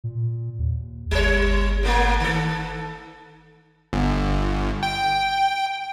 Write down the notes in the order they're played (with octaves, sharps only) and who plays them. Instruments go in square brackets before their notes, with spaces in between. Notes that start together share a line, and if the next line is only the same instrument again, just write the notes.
[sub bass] A#2
D#2
[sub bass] G1 [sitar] G3 C#5
[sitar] A2 A3 A#3
D#3 A4
[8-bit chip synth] G1
G5